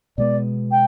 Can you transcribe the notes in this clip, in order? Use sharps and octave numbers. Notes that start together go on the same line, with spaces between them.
B2 G#3 B3 D5
G5